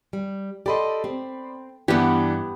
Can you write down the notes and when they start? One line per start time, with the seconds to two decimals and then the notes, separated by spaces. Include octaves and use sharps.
0.13 G3
0.66 G4 A4 D5 D#5 B5 C6
1.04 C4
1.88 G2 E3 G3 B3 D4 E4 G4 F#5